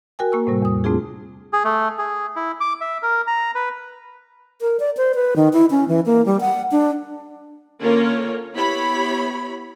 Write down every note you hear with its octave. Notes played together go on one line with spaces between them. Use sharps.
F#4 A#4 G5 G#5
A#3 C#6 E6
A2 C3 G3
E2 D#6
A3 C4 D4 F4 G#4
G#4
A3
G#4
E4
D6
E5
A#4
A#5
B4
A#4
D5
C5
B4
D#3
E4
C#4
E3
A#3
G3
F#5
D4
D3 A#3 C#4 F4 A#4 C#5
B3 E4 G4 C#5 B5